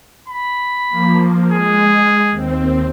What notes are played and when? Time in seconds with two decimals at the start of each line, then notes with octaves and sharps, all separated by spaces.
0.28 B5
0.90 F3 A#3
1.52 G#3 G#4
2.30 D#2 C4